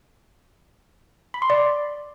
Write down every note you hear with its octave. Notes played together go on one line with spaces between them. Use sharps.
B5
C6
D5